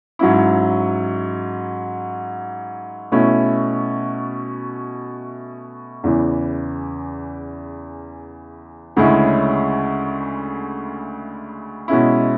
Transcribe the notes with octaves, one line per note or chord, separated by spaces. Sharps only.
G#2 F#3 C#4 E4
B2 A3 C#4 E4
E2 C#3 E3
D2 C#3 G#3 C#4 E4
B2 G#3 C#4 E4